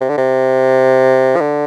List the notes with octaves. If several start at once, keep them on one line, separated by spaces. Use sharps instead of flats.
C3
D3
C3
F3
D3